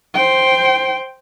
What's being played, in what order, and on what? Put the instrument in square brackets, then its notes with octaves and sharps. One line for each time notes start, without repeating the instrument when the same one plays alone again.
[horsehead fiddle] C5 G5